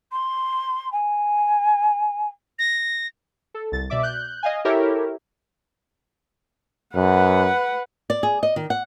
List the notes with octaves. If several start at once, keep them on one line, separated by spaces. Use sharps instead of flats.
C6
G#5
A#6
A4
C2 A6
B2 D5 E5 D6
F#6 G6
D#5 F5 G#5
E4 G4 A4 A#4 C#5 E5
F#2 B4 F#5
D5
G#4
D#5
D#3
F#5